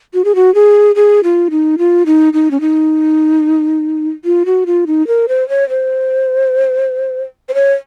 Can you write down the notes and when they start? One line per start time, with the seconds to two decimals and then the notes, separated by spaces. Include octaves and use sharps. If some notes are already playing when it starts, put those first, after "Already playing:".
0.14 F#4
0.25 G#4
0.35 F#4
0.55 G#4
0.96 G#4
1.24 F4
1.51 D#4
1.78 F4
2.06 D#4
2.33 D#4
2.51 C#4
2.61 D#4
4.25 F4
4.46 F#4
4.66 F4
4.87 D#4
5.07 A#4
5.29 C5
5.49 C#5
5.69 C5
7.49 C5
7.54 C#5